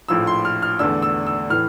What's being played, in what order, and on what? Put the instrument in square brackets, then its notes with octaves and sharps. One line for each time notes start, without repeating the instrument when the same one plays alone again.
[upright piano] A#1 A2 F3 E6
C6
F6
F6
E2 D3 A3 D4 E6
E6
E6
A2 E3 F6